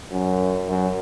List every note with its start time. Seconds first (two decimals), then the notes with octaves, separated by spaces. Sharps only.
0.11 F#2
0.69 F#2